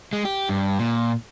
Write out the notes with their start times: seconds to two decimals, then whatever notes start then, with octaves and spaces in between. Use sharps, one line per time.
0.13 G#3
0.25 G4
0.49 G2
0.79 A#2